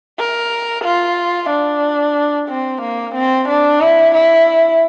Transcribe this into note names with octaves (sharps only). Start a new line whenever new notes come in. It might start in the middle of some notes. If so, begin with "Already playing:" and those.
A#4
F4
D4
C4
A#3
C4
D4
E4
E4